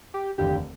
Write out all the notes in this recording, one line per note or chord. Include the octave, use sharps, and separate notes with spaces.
G4
F1 D#2 D3 G4